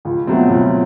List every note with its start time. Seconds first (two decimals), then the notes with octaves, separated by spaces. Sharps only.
0.05 C#2
0.27 B2 F#3 A3 C4
0.49 C#2